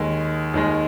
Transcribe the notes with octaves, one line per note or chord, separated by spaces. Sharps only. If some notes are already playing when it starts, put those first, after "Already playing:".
Already playing: D#2 D#3 G#3
D#2 D#3 G#3